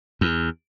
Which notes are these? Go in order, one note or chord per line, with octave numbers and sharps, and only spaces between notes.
E2